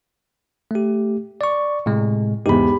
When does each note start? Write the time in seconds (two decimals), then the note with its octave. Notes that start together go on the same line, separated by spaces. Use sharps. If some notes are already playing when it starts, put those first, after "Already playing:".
0.71 A3 G4
1.41 D5 C#6
1.86 A2 C3 G#3
2.46 E2 G#2 G4 B5